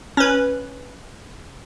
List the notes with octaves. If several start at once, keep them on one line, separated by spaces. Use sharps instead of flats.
C#4 B4